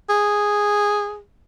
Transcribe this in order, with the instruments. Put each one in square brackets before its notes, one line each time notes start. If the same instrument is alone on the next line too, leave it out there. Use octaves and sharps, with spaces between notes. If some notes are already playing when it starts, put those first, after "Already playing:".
[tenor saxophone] G#4